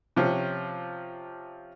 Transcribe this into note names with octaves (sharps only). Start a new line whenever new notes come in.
C3 F3 C#4